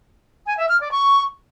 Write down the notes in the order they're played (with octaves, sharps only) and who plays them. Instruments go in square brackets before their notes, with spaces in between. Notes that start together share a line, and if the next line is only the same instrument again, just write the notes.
[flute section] G#5
E5
F6
D5
C#6